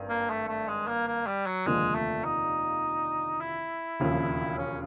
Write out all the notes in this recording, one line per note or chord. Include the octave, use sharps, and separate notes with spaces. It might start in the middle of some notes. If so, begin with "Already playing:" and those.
Already playing: G#1 G2 D#3
A#3
A3
A3
G#3
A#3
A#3
G3
F#3
F1 D#2 D3 F3 G#3 A#3
A3
D#4
E4
E1 D#2 C#3 F3
C#4